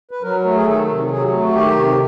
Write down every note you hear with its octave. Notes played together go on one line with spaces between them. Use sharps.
B4
F#3 A#4
A3
G#4
D#3 A4
C3
F#3 G#4
A3
F#4
D#3 G4
C3